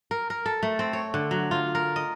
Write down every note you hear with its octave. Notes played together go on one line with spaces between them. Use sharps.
A#4
A#4
A4
A3
C4
C#5
D3
F#3
F4
A#4
D#5